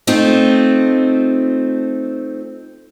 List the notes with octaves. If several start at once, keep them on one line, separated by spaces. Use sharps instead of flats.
A3 C4 D#4 F4